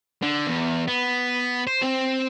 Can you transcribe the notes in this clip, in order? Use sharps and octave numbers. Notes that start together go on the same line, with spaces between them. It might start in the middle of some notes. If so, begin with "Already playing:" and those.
D3
E2
B3
C5
C4